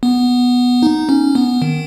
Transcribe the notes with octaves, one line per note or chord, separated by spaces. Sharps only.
B3
D#4
C#4
B3
D#3